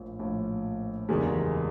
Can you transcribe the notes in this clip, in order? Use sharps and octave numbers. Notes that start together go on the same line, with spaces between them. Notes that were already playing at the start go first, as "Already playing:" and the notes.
Already playing: A#1 A2 F3
A#1 A2 F3
F#1 E2 C3 D#3 G#3